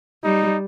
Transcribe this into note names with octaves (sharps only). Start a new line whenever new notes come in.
G3 D#4